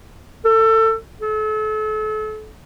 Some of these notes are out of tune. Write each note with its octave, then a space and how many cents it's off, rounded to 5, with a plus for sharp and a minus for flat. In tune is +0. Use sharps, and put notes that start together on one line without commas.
A4 +25
A4 -35